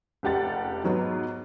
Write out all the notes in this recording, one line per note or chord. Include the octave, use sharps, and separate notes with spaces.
F1 C#2 G4 F#5 A6
G#2 F#3 B3